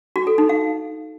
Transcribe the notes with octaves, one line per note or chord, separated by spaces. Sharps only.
F#4
A4
D#4
F5